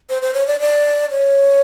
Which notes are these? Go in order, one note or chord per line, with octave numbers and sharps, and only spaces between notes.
C5
C5
C#5
D5
D5
C#5